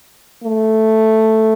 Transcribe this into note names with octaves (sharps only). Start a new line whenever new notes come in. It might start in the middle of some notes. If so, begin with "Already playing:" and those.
A3